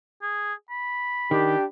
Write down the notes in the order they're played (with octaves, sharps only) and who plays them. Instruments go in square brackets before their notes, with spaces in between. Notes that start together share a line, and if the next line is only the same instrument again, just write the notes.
[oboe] G#4
B5
[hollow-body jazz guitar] D#3 [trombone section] D4 G4